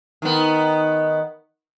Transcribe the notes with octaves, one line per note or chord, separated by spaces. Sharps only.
D#3 B3